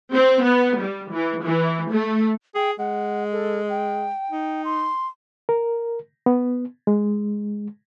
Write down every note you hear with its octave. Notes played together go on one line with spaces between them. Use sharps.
C4
B3
G3
E3
E3
A3
G#4 G5
G#3 F#5
A4
G5
D#4
C6
A#4
B3
G#3